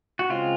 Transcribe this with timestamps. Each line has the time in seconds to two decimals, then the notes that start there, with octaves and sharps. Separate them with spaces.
0.19 F#4
0.29 C#3 G#3 C4 F4